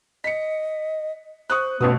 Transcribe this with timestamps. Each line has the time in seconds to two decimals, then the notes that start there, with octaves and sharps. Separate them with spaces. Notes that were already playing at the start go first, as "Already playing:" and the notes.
0.24 D#5 B6 C#7
1.50 C5 C#6 D#6 F#6
1.81 A1 B2 A3 B3 C#4 D#6